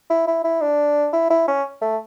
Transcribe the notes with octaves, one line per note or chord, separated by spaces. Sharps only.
E4
E4
E4
D4
E4
E4
C#4
A3